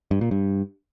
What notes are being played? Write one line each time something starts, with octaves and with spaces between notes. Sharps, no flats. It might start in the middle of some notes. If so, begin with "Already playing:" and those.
G2
A#2
G2